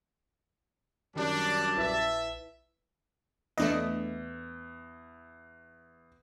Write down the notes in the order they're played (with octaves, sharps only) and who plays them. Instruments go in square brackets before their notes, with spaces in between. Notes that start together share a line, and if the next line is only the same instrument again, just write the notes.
[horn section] F#2 G3 D5 [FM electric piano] D#3 [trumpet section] D4 [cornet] A5
[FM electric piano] A#1 E4 B4 [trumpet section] E5
[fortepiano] E2 [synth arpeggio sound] A3 D4 D#5